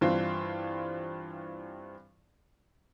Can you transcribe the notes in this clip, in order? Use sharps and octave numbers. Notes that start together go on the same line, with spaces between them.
G2 E3 C4 F4